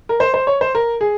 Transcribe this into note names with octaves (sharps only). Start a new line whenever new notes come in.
A#4
C5
C5
C#5
C5
A#4
G#4